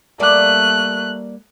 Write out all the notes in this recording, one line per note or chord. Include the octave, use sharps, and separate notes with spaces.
G3 A3 A#3 D5 F#6